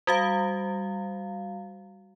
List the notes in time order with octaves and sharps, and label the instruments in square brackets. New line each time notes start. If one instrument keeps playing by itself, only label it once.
[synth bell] G3 F#4 F5